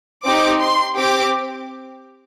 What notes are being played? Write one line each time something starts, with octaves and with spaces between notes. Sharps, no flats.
C4 D#4 G4 D6
C6
C4 G4 D6